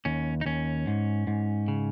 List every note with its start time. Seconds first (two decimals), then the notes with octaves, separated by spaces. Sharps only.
0.05 D#2 C#4
0.41 D#4
0.46 D#2 C#4
0.87 G#2
1.27 G#2
1.68 C#3